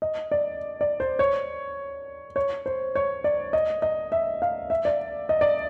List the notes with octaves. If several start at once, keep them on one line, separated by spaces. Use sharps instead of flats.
D#5
D5
D5
C5
C#5
C#5
C5
C#5
D5
D#5
D#5
E5
F5
E5
D5
D#5
D5